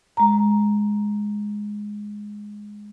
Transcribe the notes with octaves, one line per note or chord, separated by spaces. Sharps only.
G#3 A#5